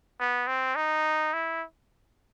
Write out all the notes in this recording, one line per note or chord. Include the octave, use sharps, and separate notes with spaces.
B3
C4
D#4
E4